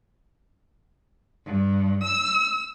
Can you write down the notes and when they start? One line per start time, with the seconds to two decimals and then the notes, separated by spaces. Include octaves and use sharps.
1.46 G2
2.04 E6